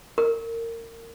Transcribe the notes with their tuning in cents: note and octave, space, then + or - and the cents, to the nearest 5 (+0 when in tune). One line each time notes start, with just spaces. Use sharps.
A#4 -25